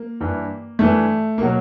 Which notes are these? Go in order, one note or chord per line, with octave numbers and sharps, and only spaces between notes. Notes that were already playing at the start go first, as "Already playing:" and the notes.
Already playing: A#3
G2 E3
G2 E3 A3
B2 F#3 A#3